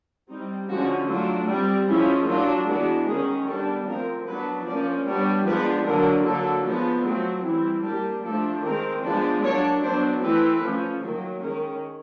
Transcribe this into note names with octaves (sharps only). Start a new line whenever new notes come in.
G3 C4 D#4
D3 F3 G#3 C#4 F#4
F#3 A3 D4 F4
G3 C4
F3 G#3 C#4 E4
F#3 A#3 D4 F4
E3 G#3 B3 D4 F#4
D#3 G#3 C#4 G#4
G3 B3 D4 A4
F3 A3 C4 A#4
F#3 B3 D4 B4
F3 A#3 C#4 D5
G3 B3 D4 C#5
F3 G#3 B3 D4 B4
D3 F#3 A#3 D4 A#4
D3 F#3 A#3 D4 A4
F3 G#3 B3 D4
F#3 A3 C4 F4
E3 G3 C4 E4
G3 A#3 D4 G4
F3 A3 D4 A4
D#3 G#3 C4 A#4
F3 G#3 B3 D4 B4
F#3 A#3 D4 C#5
F#3 B3 D4 C5
E3 A3 C4 B4
F3 A3 C#4
D#3 F#3 A#3
D#3 G#3 C#4 A#4